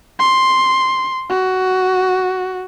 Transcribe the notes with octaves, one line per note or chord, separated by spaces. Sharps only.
C6
F#4